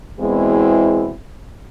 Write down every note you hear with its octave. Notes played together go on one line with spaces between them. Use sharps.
E2 B2 G#3 C4 E4